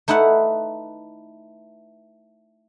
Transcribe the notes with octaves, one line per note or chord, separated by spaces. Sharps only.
A3 D#4 E4 B4 F#5